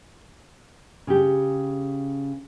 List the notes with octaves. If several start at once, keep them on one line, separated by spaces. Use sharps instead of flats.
C#3 G4